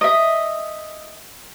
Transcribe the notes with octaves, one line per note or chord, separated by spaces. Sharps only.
D#5 E5